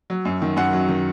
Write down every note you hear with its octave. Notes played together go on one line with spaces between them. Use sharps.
F#3
F#2
D#3
F#2 F#5
F#3
D#3